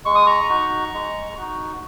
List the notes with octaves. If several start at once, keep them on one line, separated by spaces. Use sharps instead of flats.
G#3 C#6
D#6
A#5 C#6
D#4 F#4
G#3
D#4 F#4